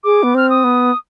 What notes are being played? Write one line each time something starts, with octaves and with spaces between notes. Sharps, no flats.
G#4 D6
B3
C4 F6
D#6
B3